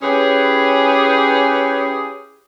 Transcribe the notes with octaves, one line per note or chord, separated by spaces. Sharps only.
C#4 E4 G4 G#4 B4 C#5